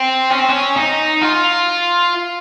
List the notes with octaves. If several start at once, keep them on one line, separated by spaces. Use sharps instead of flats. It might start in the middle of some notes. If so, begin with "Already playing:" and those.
Already playing: C4
C#4
C4
C#4
D#4
F4